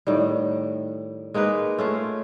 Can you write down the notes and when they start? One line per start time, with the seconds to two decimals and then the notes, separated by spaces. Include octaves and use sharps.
0.07 A2 D#3 G3
1.34 G#3 A#3 D#4 B4
1.78 A3 C#4 F4